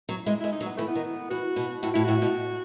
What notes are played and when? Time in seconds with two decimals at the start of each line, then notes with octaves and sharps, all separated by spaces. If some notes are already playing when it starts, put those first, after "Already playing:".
0.09 F#3
0.26 G#3 E4
0.40 G#3 E4
0.52 D#4
0.60 F#3
0.66 B3
0.77 E3 A3
0.88 B3
0.95 D#3
1.30 E3 F#4
1.56 B2
1.82 A2 F#4
1.94 A2 E4
2.04 A2 F#4
2.22 B2